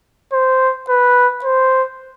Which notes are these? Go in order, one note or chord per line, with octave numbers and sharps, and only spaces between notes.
C5
B4
C5